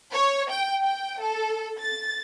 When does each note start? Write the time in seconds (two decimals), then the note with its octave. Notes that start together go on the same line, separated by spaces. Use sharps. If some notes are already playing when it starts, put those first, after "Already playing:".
0.12 C#5
0.50 G5
0.83 G5
1.20 A4
1.79 A6